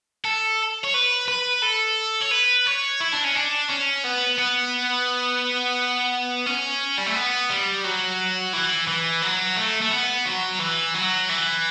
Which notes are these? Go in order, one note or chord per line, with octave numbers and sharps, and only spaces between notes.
A4
C#5
B4
B4
A4
C#5
B4
C#5
E4
D4
C#4
D4
C#4
B3
B3
C#4
G3
A3
B3
G3
F#3
E3
E3
F#3
A3
A3
B3
F#3
E3
F#3
E3